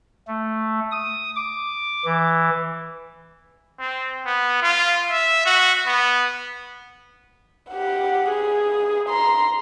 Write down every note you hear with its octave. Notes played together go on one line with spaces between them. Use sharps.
A3
D#6
D6
E3
C4
B3
F4
E5
F#4
B3
G4 F#5
G#4
A#5 C6